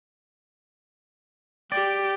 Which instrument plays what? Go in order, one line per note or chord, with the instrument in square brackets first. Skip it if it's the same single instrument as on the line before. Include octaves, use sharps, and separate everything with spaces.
[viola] G4 G5 [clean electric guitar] D5